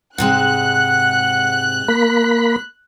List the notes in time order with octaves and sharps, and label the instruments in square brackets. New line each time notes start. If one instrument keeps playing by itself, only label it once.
[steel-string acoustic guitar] G#2 C3 G#3 [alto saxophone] F#5 [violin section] F#6
[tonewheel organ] A#3 B5